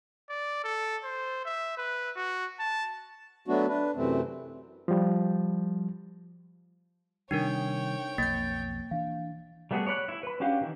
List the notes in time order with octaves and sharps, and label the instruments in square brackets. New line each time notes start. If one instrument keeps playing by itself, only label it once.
[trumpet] D5
A4
C5
E5
B4
F#4
A5
[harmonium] F#3 A3 B3 D4 F#4
D4 B4
F#2 C3 E3 A3 C4
[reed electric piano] F3 G3
[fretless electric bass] C3 D#3 G3 [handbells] D4 D#4 A#4 [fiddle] C#5 G5
[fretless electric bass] B1 F2 [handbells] A#3 G6 [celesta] A6
[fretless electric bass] E3 D4 [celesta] F5
[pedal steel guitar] G3 A3 B3 F#4 G#4
C#5 D5 B5 F#6
E4
B4 B5
C#4 D4 F#4 G4 F5
D#3 E3